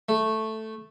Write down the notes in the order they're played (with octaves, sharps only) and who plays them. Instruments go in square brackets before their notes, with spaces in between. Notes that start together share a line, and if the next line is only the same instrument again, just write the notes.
[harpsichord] A3